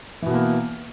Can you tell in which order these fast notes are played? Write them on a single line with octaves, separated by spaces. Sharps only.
E3 B2 B3 A#3